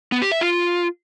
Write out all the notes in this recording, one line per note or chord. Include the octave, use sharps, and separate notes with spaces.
B3
G4
E5
F4